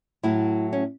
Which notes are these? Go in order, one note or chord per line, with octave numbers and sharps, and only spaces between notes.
A2 F#3 A3 E4
C#4